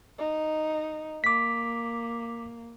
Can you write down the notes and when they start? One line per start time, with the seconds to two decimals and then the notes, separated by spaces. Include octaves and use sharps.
0.18 D#4
1.24 A#3 D6 B6